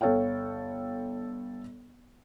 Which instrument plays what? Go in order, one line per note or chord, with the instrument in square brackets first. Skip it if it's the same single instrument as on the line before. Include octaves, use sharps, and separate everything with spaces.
[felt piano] G1 A4 C#5 F5 G5